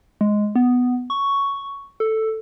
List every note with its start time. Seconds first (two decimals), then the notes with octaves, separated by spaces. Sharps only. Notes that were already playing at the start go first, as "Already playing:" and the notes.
0.21 G#3
0.55 B3
1.10 C#6
2.00 A4